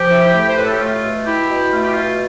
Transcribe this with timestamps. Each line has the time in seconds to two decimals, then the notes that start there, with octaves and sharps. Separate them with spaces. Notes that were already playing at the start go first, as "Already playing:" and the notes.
Already playing: F3 G4
0.10 E4
0.33 A3
0.49 C5
0.56 A2 B4
0.64 A4
0.72 G4
0.80 A3 F4
1.03 B2
1.26 E4 G4
1.50 B2
1.73 A3 F4
1.83 G4
1.93 B2 F4